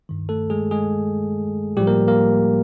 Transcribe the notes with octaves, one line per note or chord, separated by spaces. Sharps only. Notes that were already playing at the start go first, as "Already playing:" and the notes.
G2 D#3
A3 A4
G#3 G#4
G#3 G#4
A2 F3 G3 G4
A#3 A#4
A#3 A#4